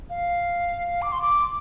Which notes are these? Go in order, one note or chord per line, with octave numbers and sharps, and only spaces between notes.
F5
D6
C6
D6